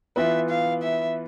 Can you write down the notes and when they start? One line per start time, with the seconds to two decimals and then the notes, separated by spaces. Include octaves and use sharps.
0.16 E3 B3 F4 B4 E5
0.50 F5
0.82 E5